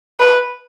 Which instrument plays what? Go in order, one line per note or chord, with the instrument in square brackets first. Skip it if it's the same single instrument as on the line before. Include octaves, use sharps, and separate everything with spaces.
[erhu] B4